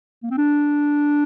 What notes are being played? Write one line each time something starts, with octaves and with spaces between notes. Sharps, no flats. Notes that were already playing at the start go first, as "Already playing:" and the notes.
A#3
C4
D4